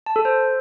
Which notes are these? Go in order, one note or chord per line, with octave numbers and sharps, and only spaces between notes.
A5
A4
C5